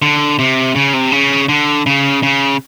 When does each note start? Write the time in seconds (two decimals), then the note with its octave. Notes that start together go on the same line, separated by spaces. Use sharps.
0.02 D3
0.39 C3
0.76 C#3
0.94 C3
1.12 C#3
1.48 D3
1.86 C#3
2.23 C#3